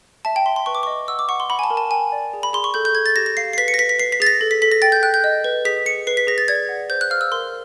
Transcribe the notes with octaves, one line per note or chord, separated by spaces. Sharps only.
E5 A5
G5
E5 C6
C6
B4 C#6
D6
D#5 C#6
F#5 E6
D6
F#5 C#6
C6
F#5 B5
G#5
A5
A#4
A5
G5 G#5
D5
G#4
B5
G#4 C6
C#6
A4 G6
G6
A4 G#6
A6
G4 A#6
A#6
F5 C7
C7
B4 B6
C#7
A#6
B4 B6
B6
B4 C7
B6
G#4 A6
A#6
A4
B6
A4 B6
A#6
G5 A6
G6
G5 F#6
G6
D#5
B4
G#4 B6
G#4 C#7
B4 C7
B6
G#4 A#6
A6
D5 G#6
F#5
C5 G6
F#6
F5 F6
E6
A#4 C6